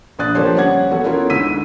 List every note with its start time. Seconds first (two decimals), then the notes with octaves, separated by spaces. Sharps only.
0.19 A#1 D4 D#6 F#6 A6
0.35 D3 F3 A#3 G4 C5 C#5
0.56 G3 C#4 C#5 F#5 G#6
0.91 E2 B3 F#4 A4 F#5
1.04 B3 C#4 E4 F4 A4 A#4
1.30 D2 G#2 E6 B6 D#7